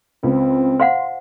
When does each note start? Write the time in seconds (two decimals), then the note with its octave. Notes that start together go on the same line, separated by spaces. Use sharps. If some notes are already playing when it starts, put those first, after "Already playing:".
0.23 C#2 C4
0.80 C5 F5 F#5 C6